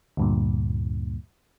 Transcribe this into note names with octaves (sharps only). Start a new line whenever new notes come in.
D2 G2 A#2